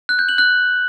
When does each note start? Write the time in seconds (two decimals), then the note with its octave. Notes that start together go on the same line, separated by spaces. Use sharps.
0.09 F#6
0.19 G6
0.29 F#7
0.38 F#6